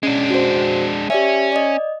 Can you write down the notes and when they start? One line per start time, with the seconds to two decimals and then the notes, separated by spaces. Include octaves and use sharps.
0.03 G#3 C#4 D4
0.30 F#4 C5
1.10 C#4 G4 D5 E5
1.52 D5 D#5